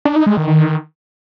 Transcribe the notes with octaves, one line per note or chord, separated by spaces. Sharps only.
D4
D#4
G#3
D#3
D#3